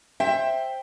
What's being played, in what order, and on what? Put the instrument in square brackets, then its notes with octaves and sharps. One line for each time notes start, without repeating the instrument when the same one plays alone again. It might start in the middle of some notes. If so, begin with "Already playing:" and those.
[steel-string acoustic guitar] C5 G5 [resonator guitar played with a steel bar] E5